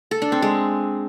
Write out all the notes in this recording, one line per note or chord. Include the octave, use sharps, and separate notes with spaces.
A4
D4
C4
G#3